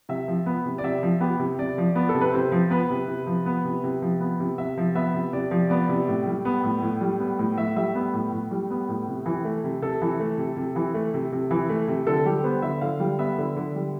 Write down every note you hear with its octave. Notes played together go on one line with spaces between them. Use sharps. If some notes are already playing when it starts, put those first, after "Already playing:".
C3 E5
F3
B3
C3
D5
C3 E5
F3
B3 G4
C3
C3 D5
F3
B3
A4
C3
B4
C3 C5
F3
B3 B4
C3
C3
F3
B3
C3
C3
F3
B3
C3
C3 E5
F3
B3 E5
C3
C3 D5
F3
B3 D5
C3
A2
G3
B3
A2
A2
G3
B3
A2
A2 E5
G3 E5
B3
A2
A2
G3
B3
A2
C3
E3
A3
C3
C3 A4
E3
A3
C3
C3
E3
A3
C3
C3
E3
A3
C3
D3 A4
G3 G4
B3 C5
D3 E5
D3 F5
G3
B3 E5
D3
D3
G3